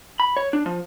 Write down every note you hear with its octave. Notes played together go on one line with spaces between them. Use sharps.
B5
C#5
D4
F3